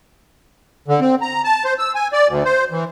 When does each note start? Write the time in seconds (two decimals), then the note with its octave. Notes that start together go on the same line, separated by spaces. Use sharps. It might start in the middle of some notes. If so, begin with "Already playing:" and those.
0.88 D3
1.01 C4
1.22 A#5
1.44 A5
1.65 C5
1.79 E6
1.95 G#5
2.13 D5
2.28 D2
2.45 C5
2.71 E3